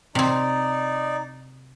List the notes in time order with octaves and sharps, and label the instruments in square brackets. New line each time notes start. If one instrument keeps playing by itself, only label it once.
[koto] C3 C4 [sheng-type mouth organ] D#4 D5